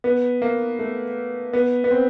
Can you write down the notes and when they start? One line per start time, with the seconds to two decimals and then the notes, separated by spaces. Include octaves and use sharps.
0.04 B3
0.42 A#3
0.79 A3
1.53 B3
1.84 B3
1.91 C4